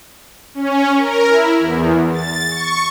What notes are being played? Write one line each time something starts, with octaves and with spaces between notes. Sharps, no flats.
C#4
A#4
E4
E2
A6
C#6